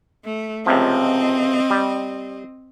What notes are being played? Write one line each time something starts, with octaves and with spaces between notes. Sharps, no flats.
A3
C#2 C3 F3 C4 D#5
G3